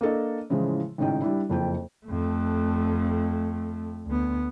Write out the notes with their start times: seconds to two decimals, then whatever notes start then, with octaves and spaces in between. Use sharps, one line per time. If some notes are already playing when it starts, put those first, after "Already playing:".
0.01 A#3 D4 A4 D#5
0.50 A2 C#3 E3 F3 G#3
0.98 G#1 A2 C#3 D#4 G5
1.22 G3 D4 E4
1.49 F#1 F2 G5
2.06 F2 A3
4.06 D2 B3